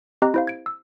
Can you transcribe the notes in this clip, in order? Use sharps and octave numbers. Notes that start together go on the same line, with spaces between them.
C4 G4 D#5 A#5 F#6
E4 C5 F5
G#6 D7
E6